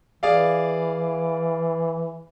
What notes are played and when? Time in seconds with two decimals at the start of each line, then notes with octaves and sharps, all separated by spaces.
0.23 E3 G#4 D5 F5